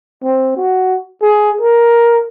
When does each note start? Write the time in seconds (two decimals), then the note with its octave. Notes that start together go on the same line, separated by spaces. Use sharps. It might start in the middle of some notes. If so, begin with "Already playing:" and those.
0.23 C4
0.57 F#4
1.22 G#4
1.61 A#4